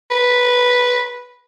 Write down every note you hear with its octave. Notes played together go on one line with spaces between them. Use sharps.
B4